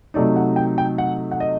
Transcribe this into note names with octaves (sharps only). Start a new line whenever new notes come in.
C3 F#3 A3 D#4 D5
F#5
G5
G5
F#5
F#5
D#5